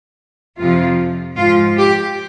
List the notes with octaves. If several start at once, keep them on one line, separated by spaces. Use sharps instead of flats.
F2 C3 F3 F4
G#2 F4
F3
G4